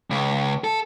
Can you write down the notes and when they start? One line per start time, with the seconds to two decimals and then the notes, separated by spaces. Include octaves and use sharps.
0.10 C#2
0.64 A4